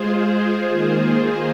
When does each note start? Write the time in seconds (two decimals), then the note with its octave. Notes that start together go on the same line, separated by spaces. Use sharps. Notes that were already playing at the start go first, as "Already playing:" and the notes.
Already playing: G#3 F4 G#4 C5
0.69 D#3 A#3 F4 G#4 C5